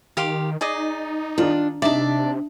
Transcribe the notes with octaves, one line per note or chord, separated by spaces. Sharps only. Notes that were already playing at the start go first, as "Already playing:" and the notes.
D#3 G4 F5 C6
D#4 G#4 D5 D#5
D#3 D4 F4 D5
C3 D4 D#4 D5 E5 A5